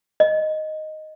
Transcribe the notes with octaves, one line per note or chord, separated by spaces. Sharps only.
D#5